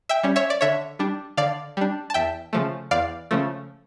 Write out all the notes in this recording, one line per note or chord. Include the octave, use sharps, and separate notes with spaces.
E5 G5
G3 C#4
C#5 E5
D5
D3 C#5 E5
G3 D4
D3 D5 F5
G3 D4
A5
E2 E5 G5
C#3 F3 A3
E2 D5 F5
C#3 F3 A3